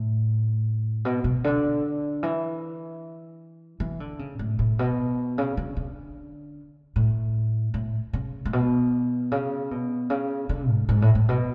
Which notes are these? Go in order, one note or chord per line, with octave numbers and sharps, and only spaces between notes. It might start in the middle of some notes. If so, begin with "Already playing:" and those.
Already playing: A2
B2
B2
D3
E3
E3
D3
C#3
A2
A2
B2
C#3
D3
D3
A2
A2
C#3
A2
B2
C#3
B2
C#3
D3
G#2
G#2
A2
A2
B2